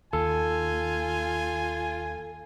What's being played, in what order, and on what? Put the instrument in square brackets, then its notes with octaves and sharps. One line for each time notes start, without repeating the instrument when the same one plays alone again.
[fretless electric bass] D#2 [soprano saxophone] F4 [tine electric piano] A4 [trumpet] G#5